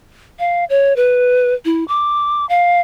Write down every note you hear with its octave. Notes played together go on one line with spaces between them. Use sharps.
F5
C#5
B4
E4
D6
F5